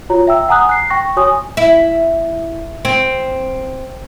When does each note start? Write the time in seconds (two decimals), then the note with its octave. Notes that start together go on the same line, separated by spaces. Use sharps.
0.10 F4 F#4 C#5 A#5
0.27 E5 G5 E6
0.49 F#5 G#5 A#5 D#6 F#6
0.69 F#6 C7
0.90 G5 C#6 A#6
1.16 F#4 C#5 G#5 D#6
1.57 E4
2.85 C4